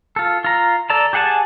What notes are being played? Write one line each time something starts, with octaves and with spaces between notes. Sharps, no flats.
F4 A4
F4 A#5
A4 D5 A5 A#5
G4 G#4 F#5 G#5 A5